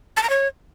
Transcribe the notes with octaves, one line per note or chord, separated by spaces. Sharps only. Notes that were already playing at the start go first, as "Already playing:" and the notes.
A5
A#5
C#5